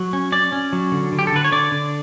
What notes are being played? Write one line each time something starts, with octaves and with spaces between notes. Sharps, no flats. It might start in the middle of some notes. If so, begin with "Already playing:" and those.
Already playing: F#3
C#4
C#4 D5
C#4
F#3
D3
D3
G4
A4
D3 B4
C#5
D3 D5
D3